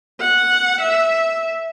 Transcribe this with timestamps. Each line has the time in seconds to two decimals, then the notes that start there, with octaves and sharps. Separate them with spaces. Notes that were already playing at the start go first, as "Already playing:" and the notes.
0.20 F#5
0.80 E5